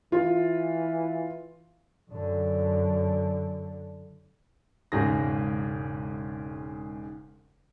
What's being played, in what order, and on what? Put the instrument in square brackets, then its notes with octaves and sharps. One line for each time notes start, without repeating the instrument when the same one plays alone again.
[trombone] E3 [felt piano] F4
[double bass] F#2 D3
[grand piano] E1 G#2 C#3 A#6